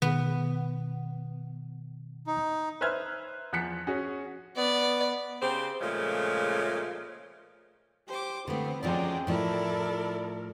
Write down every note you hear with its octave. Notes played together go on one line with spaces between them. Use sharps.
B2 D#3 B3
D#4
B4 C5 E5 F6 G#6
E2 F3 F#6 B6 C#7
C#4 F#4 G#4
B3 D5
C#3 C4 G4 C5
A#2 C#3 F3 G#3 A3
G4 C5 D6
D3 A3 B3 C4
F2 F3 F#3 G#3 C4 C#4 D5 G5
A2 F3 E4 A4 A#4 D5